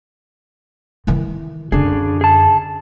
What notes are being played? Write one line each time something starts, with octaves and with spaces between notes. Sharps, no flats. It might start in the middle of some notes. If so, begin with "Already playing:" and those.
D#3 E3
F#2 D3 D4 G#4
G#4 A5